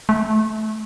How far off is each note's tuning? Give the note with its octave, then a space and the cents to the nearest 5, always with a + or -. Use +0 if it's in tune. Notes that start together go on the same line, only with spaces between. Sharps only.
A3 -25